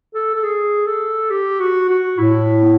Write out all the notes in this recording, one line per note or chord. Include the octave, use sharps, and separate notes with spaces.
A4
A4
G#4
A4
G4
F#4
F#4
A2 E4
B3